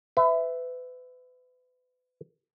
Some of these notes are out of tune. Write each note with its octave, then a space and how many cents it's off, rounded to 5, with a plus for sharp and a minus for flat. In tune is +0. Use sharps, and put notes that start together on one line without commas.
B4 +30 E5 +0